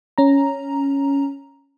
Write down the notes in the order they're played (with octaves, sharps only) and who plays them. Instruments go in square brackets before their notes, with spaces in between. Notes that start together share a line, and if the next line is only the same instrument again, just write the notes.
[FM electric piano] C#4 A#5